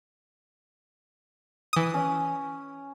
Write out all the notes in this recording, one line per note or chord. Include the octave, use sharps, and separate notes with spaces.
E3 D#6
C#4